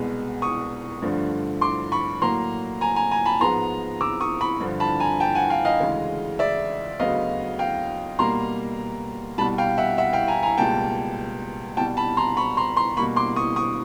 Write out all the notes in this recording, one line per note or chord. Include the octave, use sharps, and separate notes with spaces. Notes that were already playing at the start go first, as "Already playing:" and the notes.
Already playing: C2 B2 G#3 B3
C#6 D#6
G2 D3 F3 A3
C6 D6
B5 C#6
A2 F#3 A#3 A#5 C6
G#5 A#5
G#5 A#5
G#5 A#5
A5 B5
G#2 F3 G#3 B3 A#5 C6
D6 E6
C#6 D#6
B5 C#6
G2 D3 F3
A5 B5
G#5 A#5
G5 A5
F#5 G#5
F5 G5
D#5 F5
D2 C#3 E3 G#3
D5 E5
D2 C#3 F#3 B3 D#5 F5
F5 G5
B2 G3 A#3 A#5 C6
C2 B2 G3 A5 B5
F5 G5
E5 F#5
E5 F#5
F5 G5
G#5 A#5
G#5 A#5
C#2 B2 G3 A#3 G5 A5
C2 B2 G3 G5 A5
A5 B5
A#5 C6
B5 C#6
A#5 C6
A#5 C6
B2 G3 A#3 B5 C#6
C6 D6
C#6 D#6
C#6 D#6